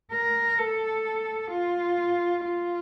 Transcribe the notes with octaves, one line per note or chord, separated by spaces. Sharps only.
A#4
A4
F4
F4